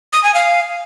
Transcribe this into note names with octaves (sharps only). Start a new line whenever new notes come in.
D#6
G#5
F5